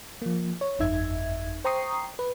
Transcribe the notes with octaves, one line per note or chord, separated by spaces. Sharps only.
F3 A#3
C#5
G1 F2 D#4 E5 G#6
C5 G5 A#5 C#6 D#6 C7
B4